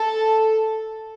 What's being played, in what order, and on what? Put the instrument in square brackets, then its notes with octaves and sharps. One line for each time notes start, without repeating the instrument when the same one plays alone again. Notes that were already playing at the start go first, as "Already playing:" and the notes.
Already playing: [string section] A4